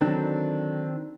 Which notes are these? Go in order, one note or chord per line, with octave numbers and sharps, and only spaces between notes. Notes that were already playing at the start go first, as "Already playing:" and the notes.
D3 D#3 F#3 C4 D4